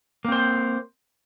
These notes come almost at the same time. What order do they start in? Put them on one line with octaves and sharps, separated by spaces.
A#3 C4 C5